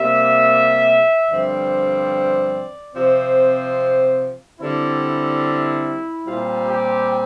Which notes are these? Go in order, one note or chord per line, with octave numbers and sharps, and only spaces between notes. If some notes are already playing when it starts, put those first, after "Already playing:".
Already playing: C3 G3 A#3 E5
G2 D3 F3 C4 D5
C3 F3 C4
D3 G3 C4 E4
A#2 G3 C4 F4
G4